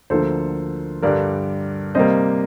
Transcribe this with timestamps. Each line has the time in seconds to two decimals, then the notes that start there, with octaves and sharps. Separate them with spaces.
0.10 D2 D3 F3 A#3 A4 C5
1.02 G2 D3 G3 A#4 D5
1.95 C3 G3 A#3 C5 D#5